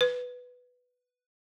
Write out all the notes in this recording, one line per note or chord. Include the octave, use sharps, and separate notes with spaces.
B4